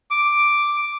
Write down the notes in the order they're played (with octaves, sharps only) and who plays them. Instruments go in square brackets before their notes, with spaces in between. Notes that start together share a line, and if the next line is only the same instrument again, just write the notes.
[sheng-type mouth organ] D6